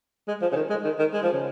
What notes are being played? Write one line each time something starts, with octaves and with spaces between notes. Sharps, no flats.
G#3
F3
C#3
D#3
G#3
D#3
D#3
G#3
F3
C#3